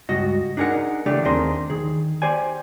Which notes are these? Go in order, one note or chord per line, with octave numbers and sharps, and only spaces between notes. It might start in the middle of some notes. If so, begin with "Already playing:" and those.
C#2 G2 F#4 D#5
D4 D#4 G#4 A#4 F#5
C#3 E3 A3 D4 G4 D5
D#2 C4 D4 G#4 A#4 C6
D#3 G#4
G4 C5 D5 G#5